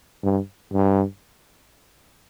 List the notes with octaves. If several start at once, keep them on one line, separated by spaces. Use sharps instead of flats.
G2
G2